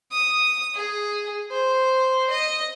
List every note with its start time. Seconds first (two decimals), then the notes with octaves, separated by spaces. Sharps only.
0.12 D#6
0.75 G#4
1.51 C5
2.30 D#5